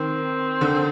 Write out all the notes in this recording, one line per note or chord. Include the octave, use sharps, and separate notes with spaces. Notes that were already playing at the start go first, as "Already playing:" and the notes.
Already playing: D#3 C4
D3